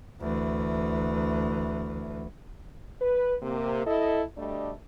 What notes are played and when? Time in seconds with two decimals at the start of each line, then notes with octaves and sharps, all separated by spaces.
0.20 D2 E3
3.02 B4
3.42 C3 A#3
3.87 E4 A4 D#5
4.38 D2 G3 A3 D4 D5 D#5